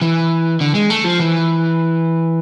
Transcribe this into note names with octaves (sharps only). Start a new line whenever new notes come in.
E3
D3
G#3
A3
F3
E3